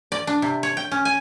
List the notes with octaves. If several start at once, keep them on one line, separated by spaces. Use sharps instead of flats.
D5
D4
C3
C#5
G5
C#4
G#5